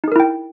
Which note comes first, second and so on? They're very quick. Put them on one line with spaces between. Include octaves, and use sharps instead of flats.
D#4 G#4 A#4 E4 G5